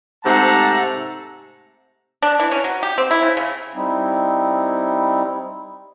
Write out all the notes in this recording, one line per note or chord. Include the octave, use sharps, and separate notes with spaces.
G#2 C3 A3 F#5 A5 A#5
D4
E3
C#4
F#3
G4
C4
E4
C#3
C#3
G3 C4 D#4 E4